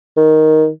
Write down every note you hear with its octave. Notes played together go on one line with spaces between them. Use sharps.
D#3